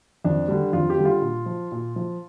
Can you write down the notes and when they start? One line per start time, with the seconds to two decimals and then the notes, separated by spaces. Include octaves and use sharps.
0.24 F2 D4
0.48 D3 G3
0.73 F2 F4
0.90 G4
0.98 D3 G3
1.05 F4
1.22 A#2
1.46 F3
1.72 A#2
1.96 F3